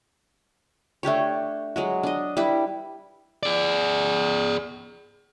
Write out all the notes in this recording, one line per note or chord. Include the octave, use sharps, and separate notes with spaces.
A3 D4 G4 C#5
F#3 G#3 F#4
D4 D#5
G3 E4 B4
G#4 D5